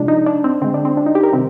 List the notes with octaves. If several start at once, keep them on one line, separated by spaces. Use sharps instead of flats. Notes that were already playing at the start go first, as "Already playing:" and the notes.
Already playing: C3 F3 G#3 D4
D#4
D4
C4
D3 G#3 C4
D4
C4
D4
D#4
G4
A#4
C3 D#3 G3 C4